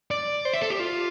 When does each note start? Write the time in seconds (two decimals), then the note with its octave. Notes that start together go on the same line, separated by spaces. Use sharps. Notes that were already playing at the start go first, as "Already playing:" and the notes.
0.11 D5
0.45 C5
0.54 E5
0.62 A4
0.70 G4
0.79 F4